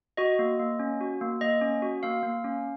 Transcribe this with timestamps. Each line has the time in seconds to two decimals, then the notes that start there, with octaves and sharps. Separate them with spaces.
0.17 F#4 D#5
0.39 A#3
0.60 A#3
0.79 C#4
1.01 F#4
1.21 A#3
1.41 A#3 D#5
1.61 C#4
1.82 F#4
2.03 A#3 F5
2.23 A#3
2.44 C#4